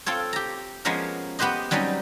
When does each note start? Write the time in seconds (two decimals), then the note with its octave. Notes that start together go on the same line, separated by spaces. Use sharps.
0.06 C4 F4 A4 C#5
0.33 G4 A#5
0.85 F3 G#3 A#3 B3 C#4 A#4
1.39 B3 G4 B4 C5 D#5
1.71 F#3 G3 C4 C#4 D#4